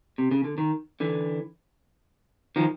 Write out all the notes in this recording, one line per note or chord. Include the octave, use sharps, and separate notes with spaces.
C3
C#3
D3
D#3
D3 E3
D#3 F3